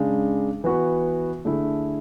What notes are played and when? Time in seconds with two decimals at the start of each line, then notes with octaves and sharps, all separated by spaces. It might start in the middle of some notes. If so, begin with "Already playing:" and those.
Already playing: C#3 G#3 D4
0.64 E3 B3 F#4 B4
1.45 D3 A3 E4 G#4